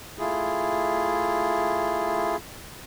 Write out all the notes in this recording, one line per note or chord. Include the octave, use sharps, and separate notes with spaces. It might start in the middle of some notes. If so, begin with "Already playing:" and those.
A3 E4 F4 G#4